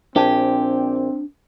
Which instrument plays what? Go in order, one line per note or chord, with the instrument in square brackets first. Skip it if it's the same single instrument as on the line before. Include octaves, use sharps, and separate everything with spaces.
[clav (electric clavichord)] A#1 G#5 [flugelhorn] C4 [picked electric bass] D4 [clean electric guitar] G4